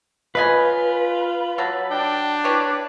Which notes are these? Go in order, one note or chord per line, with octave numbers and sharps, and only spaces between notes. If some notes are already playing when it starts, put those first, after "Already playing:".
C#3 F4 B4 D#5 G#5
F#3 A4
D4 G5
E4 G4 B4 C#5